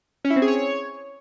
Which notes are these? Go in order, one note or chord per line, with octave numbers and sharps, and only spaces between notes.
C#4
E4
C4
G#4
C#5